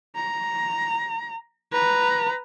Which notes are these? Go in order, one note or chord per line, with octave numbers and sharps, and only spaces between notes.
A#5
B4 A#5